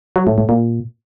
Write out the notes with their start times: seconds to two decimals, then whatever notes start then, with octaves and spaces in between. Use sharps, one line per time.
0.16 F#3
0.27 A2
0.38 A2
0.49 A#2